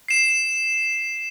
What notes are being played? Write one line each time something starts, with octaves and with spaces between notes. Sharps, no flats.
C7 E7